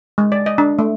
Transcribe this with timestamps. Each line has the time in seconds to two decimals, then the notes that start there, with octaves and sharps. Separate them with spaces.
0.18 G#3
0.32 D5
0.46 D#5
0.58 D4
0.79 A3